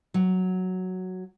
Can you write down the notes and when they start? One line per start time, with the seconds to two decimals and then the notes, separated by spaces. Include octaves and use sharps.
0.14 F#3